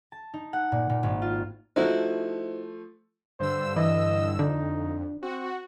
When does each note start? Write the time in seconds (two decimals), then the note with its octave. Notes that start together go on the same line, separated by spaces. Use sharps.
0.12 A5
0.34 D#4
0.53 F#5
0.72 A#2
0.90 A#2
1.03 G#1
1.22 F4
1.76 F3 A3 D#4 E4 F#4 C5
3.40 G2 D3 C5 E6
3.76 E3 D#5
4.39 F2 D3 D#4
5.23 C4 F#4